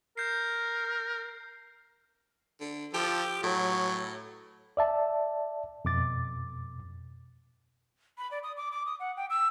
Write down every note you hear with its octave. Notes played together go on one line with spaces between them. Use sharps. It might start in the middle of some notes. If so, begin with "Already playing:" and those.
A#4 G6 C7
D3
F3 G4 A4
A2 F#3
D5 E5 A5
F2 B2 D6 A6
B5
D5
D#6
D6
D6
D#6
F#5
G5
E6